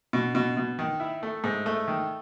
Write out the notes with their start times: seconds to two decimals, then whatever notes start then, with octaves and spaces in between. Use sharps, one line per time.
0.13 B2
0.35 B2
0.57 B2
0.79 D#3
1.00 E4
1.23 A3
1.44 G#2
1.66 A3
1.88 D#3